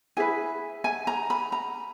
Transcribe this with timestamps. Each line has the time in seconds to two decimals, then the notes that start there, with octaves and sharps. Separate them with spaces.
0.17 E4 G#4 B4 G#5
0.84 G#5
1.07 A#5
1.30 B5
1.52 A#5